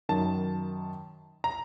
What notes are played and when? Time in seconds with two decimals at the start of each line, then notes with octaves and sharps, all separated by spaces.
0.09 F#2 D#3 A5
1.44 A#5